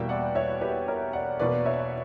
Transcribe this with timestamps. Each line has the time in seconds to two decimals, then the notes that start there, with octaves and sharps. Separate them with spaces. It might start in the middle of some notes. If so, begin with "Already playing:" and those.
Already playing: E2 B2 G3 A#3 E5 G5
0.09 D5 F#5
0.35 C#5 E5
0.61 G4 B4
0.88 A#4 C#5
1.13 D5 F#5
1.40 E2 B2 A#3 B4 D5
1.66 C#5 E5